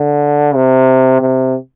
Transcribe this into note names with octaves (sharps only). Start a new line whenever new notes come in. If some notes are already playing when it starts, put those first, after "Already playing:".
Already playing: D3
C3
C3